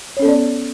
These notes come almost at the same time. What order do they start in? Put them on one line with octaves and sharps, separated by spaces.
C#5 C#4 A4 B3 D5